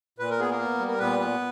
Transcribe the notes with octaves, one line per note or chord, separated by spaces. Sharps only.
A#2 B4
A#4
B3 G#4
A#3 A#4
B3
G3
A#4
A#2 B3 B4
B3